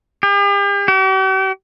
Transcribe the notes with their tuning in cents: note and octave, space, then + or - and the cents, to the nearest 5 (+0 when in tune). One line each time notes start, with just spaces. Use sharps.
G4 +45
G4 -45